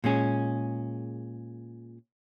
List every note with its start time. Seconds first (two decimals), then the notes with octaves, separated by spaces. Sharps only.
0.04 A#2 G#3 C#4 G#4